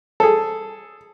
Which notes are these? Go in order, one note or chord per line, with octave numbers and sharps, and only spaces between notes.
G#4 A4